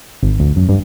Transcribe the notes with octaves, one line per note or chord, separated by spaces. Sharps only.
G#1
D2
F#2
G2